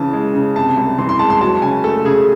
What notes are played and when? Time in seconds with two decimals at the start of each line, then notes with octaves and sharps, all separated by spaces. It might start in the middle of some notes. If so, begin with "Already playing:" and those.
Already playing: C#3 E3 A5
0.13 G#3
0.34 C#3
0.56 C3 A5
0.77 C2
0.98 E3 C6
1.09 C6
1.19 G#3 A5
1.30 C6
1.41 F#3 A5
1.62 C#3 G#5
1.84 A3 A4
2.05 C#3 G#4